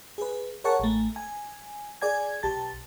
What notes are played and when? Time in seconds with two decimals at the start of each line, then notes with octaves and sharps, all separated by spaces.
0.18 G#4 B4
0.64 G#4 A#4 C#5 F#5 A5 C#6
0.80 A1 A3
1.16 G#5
2.01 G#4 D5 G#5 G#6
2.43 B1 G4 A5 A6